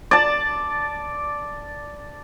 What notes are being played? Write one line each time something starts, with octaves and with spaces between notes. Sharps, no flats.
D5 A5